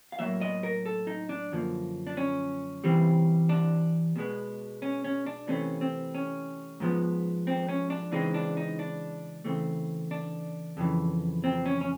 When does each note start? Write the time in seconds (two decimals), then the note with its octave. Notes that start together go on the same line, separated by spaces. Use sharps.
0.12 F5
0.19 A2 F#3 A#3 E5
0.41 D#5
0.63 A#4
0.86 A4
1.07 D#4
1.29 D4
1.52 F#2 D3 F3 A#3
2.07 D4
2.17 C#4
2.84 C3 E3 G3 C4
3.49 D4
4.16 B2 G#3 B3
4.82 C#4
5.04 C#4
5.26 D4
5.48 C3 E3 A3 C4 C#4
5.81 C4
6.15 C#4
6.80 G#2 F3 G#3 B3
7.47 C4
7.69 C#4
7.90 D4
8.12 C#3 E3 G#3 C4 D#4
8.34 D4
8.57 D#4
8.79 D4
9.45 C#3 E3 A3 C4
10.11 D4
10.77 F2 C#3 E3
11.44 C4
11.66 C#4
11.81 C#4